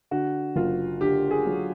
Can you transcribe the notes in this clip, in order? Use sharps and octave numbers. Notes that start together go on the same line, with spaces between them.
D3 F#4
F#1 F4
D3 G4
G#4
F#3